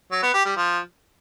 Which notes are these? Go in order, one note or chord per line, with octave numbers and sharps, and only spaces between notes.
F#3
B3
G4
G3
F3